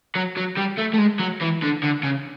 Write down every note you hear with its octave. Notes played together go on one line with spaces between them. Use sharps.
F#3
F#3
G3
A3
A3
G#3
F#3
E3
D3
D3
C#3